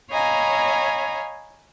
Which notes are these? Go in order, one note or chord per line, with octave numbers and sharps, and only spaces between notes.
C#5 D#5 F5 G#5 A#5 B5